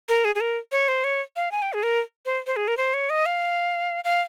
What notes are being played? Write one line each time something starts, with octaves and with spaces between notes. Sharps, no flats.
A#4
G#4
G#4
A#4
C#5
C5
C#5
F5
G#5
G5
G#4
A#4
C5
C5
G#4
A#4
C5
C#5
D#5
F5
F5